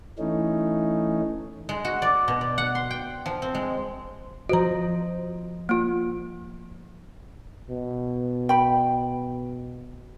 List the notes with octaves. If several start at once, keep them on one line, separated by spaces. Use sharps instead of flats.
E3 A3 C#4 D#4
G#3
F#4
D5
B2
D5
F#5
C6
G5
F3
C4
G#3
F3 F#4 C5 D#5 A#5
A#3 F4
B2
G5 B5